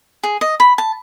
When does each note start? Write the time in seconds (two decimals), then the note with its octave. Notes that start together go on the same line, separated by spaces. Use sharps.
0.23 G#4
0.41 D#5
0.60 B5
0.78 A5